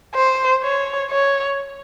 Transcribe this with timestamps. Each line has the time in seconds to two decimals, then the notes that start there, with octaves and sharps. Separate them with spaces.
0.15 C5
0.63 C#5
1.10 C#5